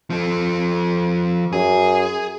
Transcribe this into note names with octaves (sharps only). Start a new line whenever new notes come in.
F3 A4
F#2 G#4